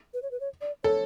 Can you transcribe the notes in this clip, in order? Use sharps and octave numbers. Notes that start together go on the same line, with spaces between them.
B4
C#5
B4
C#5
D5
A4 C#5